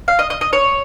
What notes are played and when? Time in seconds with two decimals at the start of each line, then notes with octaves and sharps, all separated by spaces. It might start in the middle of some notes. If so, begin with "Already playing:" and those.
0.08 F5
0.19 D#5
0.30 D#5
0.41 D#5
0.53 C#5